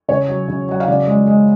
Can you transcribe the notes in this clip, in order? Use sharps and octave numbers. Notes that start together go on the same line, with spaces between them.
C#3 C#5
F#3
C#3
F#3 F#5
F5
C#3 D5
G#3
G#3